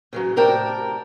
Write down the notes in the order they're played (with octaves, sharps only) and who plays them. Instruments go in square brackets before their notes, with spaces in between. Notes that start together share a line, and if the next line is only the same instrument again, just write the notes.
[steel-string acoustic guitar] C#3 E3 F#3
A2 C3 A#4 D5 G5 A5